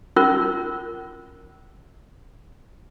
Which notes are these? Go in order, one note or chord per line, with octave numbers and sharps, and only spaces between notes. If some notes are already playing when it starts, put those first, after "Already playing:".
C#4 F4 A#4